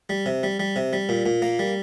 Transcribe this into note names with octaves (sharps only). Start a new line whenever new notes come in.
G3
C3
G3
G3
C3
G3
A#2
A#2
A#3
G3